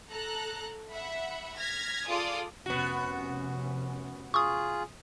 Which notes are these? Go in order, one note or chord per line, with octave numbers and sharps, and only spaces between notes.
A4 A#5 F#6
E5 F#5 B5
F6 G#6 A#6 B6
F4 G#4 A4 D5 D#6
F1 C3 B3 C#4 F#4
F4 G#4 C#6 D#6